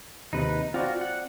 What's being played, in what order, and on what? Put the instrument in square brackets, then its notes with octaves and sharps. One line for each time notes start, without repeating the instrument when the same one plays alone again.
[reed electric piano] D#2 C3 [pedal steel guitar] D#4 B4
[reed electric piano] C4 D5 [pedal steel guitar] F4 F#4
[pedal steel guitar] F#5